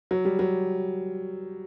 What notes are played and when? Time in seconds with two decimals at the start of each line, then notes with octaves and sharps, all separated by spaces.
0.11 F#3
0.25 G3
0.39 F#3